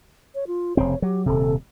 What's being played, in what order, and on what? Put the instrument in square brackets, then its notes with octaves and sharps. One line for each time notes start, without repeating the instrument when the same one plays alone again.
[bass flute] C#5
F4
[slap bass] F1 C#3 C4 [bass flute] C#5
[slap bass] F#3 [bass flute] G4
[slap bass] D#1 C3 [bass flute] A4